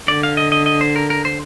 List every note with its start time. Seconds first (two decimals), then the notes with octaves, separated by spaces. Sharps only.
0.08 D3 D5
0.23 F5
0.37 D#5
0.52 D#5
0.66 D#5
0.81 C5
0.96 A#4
1.10 A#4
1.25 C5